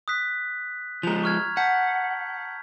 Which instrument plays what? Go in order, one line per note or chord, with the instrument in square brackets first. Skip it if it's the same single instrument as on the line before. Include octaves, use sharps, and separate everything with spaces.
[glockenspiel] D#6 F#6 B6
[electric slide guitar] F3 G#3 [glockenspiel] A#5 F7
[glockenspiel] C#6 F6 G#6
[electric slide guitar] F#5 [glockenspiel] A5 G6 B6